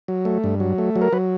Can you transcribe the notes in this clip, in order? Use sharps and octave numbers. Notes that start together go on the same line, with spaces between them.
F#3
A3
G2
F#3
A3
F#3
A#4
F#3 B4